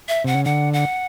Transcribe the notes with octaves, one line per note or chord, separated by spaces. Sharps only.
E5
C3 F#5
C#3
D3 F#5
F#5